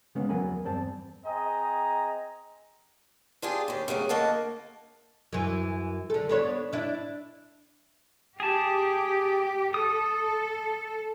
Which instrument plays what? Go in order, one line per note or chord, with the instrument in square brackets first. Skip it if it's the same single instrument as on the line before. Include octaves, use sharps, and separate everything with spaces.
[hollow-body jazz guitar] C#3 G#3 A#3 B3 C#4
E2 F#3 A#4 G#5 B5
E2 G2 C4 A5
[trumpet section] C4 G#4 D#5 A#5
[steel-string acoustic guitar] D4 F4 G4 G#4
D#2 G4
C#3 F#3 G3 A3
D2 A#3 D#5 F#5 A5
[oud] F#2 E3
D3 A4
B3 D4 C#5
D4 E4
[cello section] G4 [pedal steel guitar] G#4 A5
[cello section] A4 [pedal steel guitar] D#6